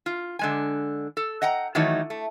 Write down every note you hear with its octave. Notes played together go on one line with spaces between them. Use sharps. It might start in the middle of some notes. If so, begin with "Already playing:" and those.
F4
D3 G#3 G#5
A4
D#5 F#5 G5 A#5
D#3 E3 F#3 A3 D#4 C#5
A3